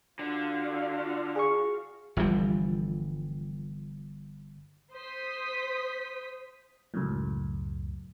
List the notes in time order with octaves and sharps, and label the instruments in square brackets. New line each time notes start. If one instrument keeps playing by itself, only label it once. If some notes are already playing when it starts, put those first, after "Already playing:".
[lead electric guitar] D3 [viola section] F4 F#4 F5
[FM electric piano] G#4 C#6
[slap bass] G1 E3 F3 G3
[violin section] C5 D#6 B6
[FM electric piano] C#2 F#2 A2